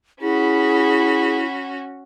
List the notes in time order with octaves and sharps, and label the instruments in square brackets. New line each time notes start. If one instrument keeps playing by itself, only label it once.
[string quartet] C#4 F#4 [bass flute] E4 [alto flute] G#4 [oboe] B5